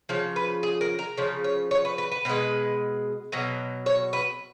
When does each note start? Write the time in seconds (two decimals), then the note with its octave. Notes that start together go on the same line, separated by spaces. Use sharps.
0.09 C#3 F3 C#5
0.36 B4
0.63 G#4
0.81 A#4
0.99 A#4
1.17 C#3 F3 C#5
1.44 C#5
1.71 C#5
1.85 B4
1.98 B4
2.12 B4
2.25 B2 G#3 B4
3.32 B2 F#3
3.86 C#5
4.13 B4